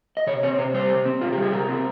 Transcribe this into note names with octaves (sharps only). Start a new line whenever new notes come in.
D#5
C3 C#5
C4 C#5
C3 C5
G3 C5
C3
C4
C3 F4
G4
G3
G#4
C3 A#4
C4